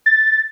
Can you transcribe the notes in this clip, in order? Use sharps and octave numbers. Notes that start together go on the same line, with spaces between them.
A6